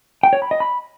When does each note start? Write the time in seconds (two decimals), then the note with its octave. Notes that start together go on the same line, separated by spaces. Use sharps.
0.23 G5
0.33 C#5
0.42 B5
0.51 D#5
0.60 B5